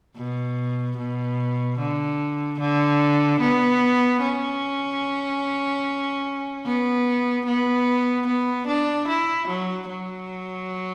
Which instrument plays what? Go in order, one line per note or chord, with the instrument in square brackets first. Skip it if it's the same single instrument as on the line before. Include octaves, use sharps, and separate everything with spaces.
[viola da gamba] B2
B2
D3
D3
B3
C#4
B3
B3
B3
D4
E4
F#3
F#3